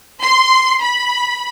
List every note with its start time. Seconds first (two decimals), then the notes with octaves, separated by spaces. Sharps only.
0.23 C6
0.82 B5